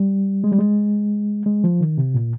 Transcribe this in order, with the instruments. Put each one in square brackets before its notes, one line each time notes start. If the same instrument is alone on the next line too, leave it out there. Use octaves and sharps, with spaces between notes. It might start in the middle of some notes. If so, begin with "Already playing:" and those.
Already playing: [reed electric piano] G3
G#3
G3
G#3
G#3
F3
D#3
C3
A#2